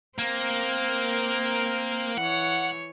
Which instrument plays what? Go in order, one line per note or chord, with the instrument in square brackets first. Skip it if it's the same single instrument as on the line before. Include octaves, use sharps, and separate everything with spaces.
[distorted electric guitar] A#3 [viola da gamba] C4 A#4
[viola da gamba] E3 C#5 [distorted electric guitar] F#5